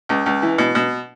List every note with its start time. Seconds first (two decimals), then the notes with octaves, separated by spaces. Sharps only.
0.09 C#2
0.26 C#2
0.42 E3
0.58 B2
0.75 B2